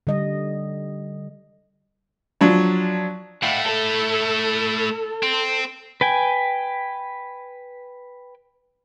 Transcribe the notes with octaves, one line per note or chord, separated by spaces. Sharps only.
D3 G3 D#5
F3 F#3 D4
A3 E4 F5 F#5
A4
C4
B4 G5 G#5